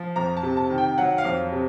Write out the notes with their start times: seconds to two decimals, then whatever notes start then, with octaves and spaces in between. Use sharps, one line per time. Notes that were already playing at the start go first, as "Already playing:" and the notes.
Already playing: F3
0.16 F2 A#5
0.37 A5
0.43 C3
0.57 A5
0.70 D#3
0.78 G5
0.98 F#3 F#5
1.18 F5
1.25 F2
1.52 C3